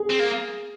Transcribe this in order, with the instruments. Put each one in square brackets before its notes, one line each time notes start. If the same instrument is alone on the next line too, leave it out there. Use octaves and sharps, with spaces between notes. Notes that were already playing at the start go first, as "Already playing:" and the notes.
Already playing: [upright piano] G#4
[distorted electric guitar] C4
A#3